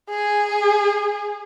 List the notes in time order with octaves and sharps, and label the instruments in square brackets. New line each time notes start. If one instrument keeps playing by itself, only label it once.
[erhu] G#4